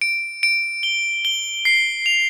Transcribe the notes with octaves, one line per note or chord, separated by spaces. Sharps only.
D7
D7
G7
G7
C7
F7